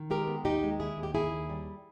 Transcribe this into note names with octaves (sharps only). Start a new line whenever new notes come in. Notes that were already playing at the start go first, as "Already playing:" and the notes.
Already playing: D#3
G#3 G4 A#4
B3
D#2 D#4 G4
G#3
D#3 E4 G#4
D#2
G4
D#3 E4 G#4
D#2
G3